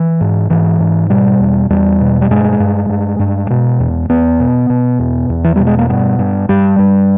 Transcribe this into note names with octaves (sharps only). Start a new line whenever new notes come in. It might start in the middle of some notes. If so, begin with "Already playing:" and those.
Already playing: E3
G#2
G#2 E3
G#2
B2 G3
E2
E2 G3
B2
G3
G2 G#3
G2
G2
G2
B2
E2
E2 B3
B2
B2
E2
E2
E3
B2 G3
G#3
A#3
G2 B3
G2
G2 G3
G2